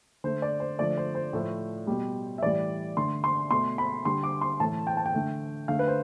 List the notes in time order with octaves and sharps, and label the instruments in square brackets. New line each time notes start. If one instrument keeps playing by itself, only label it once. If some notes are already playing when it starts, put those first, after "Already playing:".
[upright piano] D3 A3 C5
D5
C5
D3 F3 A3 D5
C5
C5
A2 F3 A3
B2 G3
E5
A2 E3 G3 D5
D3 A3 C6
C6
B2 A3 C6
B5
D3 G3 C6
D6
C6
A2 E3 A3 A5
G5
A5
G5
D3 A3
D3 A3 F5
B4
C5